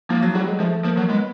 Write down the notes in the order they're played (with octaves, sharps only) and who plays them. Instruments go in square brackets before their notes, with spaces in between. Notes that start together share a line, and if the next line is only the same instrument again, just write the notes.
[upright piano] F3 [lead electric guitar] A#3
[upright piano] F#3
[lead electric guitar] F#3 [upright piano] G3
[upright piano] G#3
[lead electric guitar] F3 [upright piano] A3
[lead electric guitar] F3 [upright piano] A#3
[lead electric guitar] F#3
[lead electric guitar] G#3 [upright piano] B3